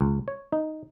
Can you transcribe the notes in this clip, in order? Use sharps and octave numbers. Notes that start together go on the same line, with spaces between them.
C#2
C#5
D#4